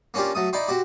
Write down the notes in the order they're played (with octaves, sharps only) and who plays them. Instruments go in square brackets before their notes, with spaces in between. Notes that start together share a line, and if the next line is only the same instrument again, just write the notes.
[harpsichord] A#3 C#4 D4 F4 G4
F#3 A3 D#6
D#4 E4 D5 G5 C6
C4 F#4 G4